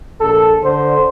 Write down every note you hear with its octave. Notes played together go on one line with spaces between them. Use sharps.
A#1 A4
D3 C5